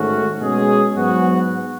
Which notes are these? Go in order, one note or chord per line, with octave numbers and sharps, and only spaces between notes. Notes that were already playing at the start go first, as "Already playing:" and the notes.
Already playing: G#2 D#3 A3 C#4 F#4
B2 G#3 C#4 G#4
G#2 F#3 B3 F#4